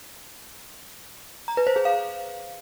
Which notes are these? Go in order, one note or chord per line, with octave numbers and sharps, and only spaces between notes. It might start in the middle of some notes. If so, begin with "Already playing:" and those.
A#5
B4
C5
G#4
F5